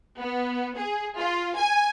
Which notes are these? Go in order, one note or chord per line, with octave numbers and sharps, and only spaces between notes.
B3
G#4
F4
G#5